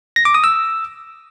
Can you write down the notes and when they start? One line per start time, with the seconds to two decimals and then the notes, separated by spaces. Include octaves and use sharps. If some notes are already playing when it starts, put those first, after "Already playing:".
0.16 A#6
0.25 D6
0.34 D#6
0.44 E6